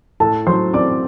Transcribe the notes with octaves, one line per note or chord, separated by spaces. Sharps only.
A2 A4 A5
F#3 C5 C6
C4 D5 D6